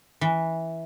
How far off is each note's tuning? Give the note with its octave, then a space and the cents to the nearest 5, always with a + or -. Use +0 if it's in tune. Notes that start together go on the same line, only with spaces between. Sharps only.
E3 -10